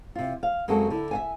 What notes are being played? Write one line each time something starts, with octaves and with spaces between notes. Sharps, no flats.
C3 F4
F5
F#2 G#3 A#3 C4 F#4 A4
D3 E4
E5 F5 G#5